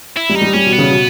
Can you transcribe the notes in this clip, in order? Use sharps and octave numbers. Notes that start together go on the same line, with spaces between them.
E4
G3
D#4
G3
G3 C#4
B2
B3
C#3
B2